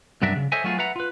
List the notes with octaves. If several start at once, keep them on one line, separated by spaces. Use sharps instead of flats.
C2 G2 F#3 D4 A#4 E5
C#3
A4 C5 C#5 D#5 E5 G#5
F#3 A3 B3 F4 F#4 G#4
B4 E5 F#5 A#5
F4 B4